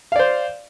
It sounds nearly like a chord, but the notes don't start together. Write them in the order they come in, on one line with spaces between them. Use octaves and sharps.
F5 D5 C5